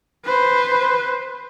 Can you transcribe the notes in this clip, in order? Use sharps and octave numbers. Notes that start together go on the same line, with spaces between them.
B4 C5